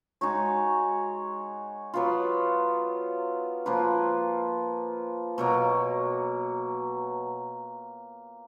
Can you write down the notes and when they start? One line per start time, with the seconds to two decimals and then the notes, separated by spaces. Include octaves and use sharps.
0.21 G#3 D#4 F#4 C#5
1.93 F#3 B3 F4
3.66 F3 A#3 F4 B4
5.38 B2 F#3 A#3